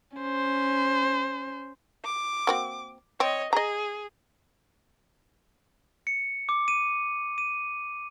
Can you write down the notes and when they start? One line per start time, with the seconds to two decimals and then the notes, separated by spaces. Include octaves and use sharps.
0.18 C#4 C5
2.04 D6
2.47 A#3 C4 F#4
3.20 C4 C#5 D#5
3.53 G#4 D#5 A#5
6.07 C#7
6.49 D6
6.68 D#7
7.38 D#7